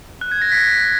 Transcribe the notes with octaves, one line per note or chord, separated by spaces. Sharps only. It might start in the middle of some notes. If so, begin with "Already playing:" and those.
F#6
G#6
A#6
B6